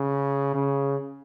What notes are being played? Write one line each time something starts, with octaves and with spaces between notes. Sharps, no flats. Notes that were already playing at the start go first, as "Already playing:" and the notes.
Already playing: C#3
C#3